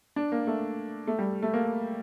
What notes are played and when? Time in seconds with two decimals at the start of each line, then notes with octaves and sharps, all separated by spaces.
0.16 D4
0.32 A#3
0.47 A3
1.07 A3
1.19 G3
1.43 A3
1.53 A#3